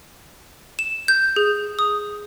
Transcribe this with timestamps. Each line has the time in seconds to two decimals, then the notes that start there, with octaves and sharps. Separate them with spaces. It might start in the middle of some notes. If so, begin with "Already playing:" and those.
0.79 E7
1.08 G6
1.36 G#4
1.79 D#6